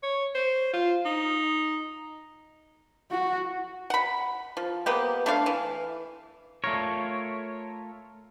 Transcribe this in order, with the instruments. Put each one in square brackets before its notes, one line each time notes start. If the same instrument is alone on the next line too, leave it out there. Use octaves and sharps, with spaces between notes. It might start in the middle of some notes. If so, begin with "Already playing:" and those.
[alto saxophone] C#5
C5
F4
D#4
[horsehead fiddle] F#4
[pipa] F#5 B5
F3
A#3 B3 G4
A3 D4 C#5 F5
E3
[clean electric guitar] A3 F4 A#4 [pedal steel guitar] C#5